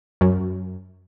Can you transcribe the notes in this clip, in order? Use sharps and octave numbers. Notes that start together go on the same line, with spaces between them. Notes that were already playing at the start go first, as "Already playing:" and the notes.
F#2